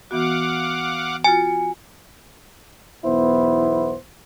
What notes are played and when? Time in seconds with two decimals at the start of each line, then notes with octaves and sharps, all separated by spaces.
0.11 E3 B3 F#4 F5 F#5 D6
1.24 F4 F#4 G#5 A6
3.04 B1 E2 B3 E4 C5